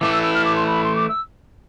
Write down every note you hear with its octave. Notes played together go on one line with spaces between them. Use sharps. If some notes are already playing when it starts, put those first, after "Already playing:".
E3 A3 E4 D6
E6
E6
F6
D6
C6
B5
C6
D6
E6